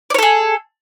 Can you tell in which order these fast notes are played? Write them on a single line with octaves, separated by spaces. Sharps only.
D5 C#5 A4 G#4